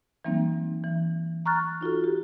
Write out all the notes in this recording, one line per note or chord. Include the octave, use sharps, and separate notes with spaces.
E3 F#3 G3 A#3 C4 D#4
E3
A#5 C#6 F6 F#6 A6
D#4 F4 F#4 A4
G4